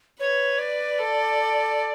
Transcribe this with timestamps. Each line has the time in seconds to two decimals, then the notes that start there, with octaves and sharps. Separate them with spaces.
0.20 B4 C#5
0.59 D5
0.99 A4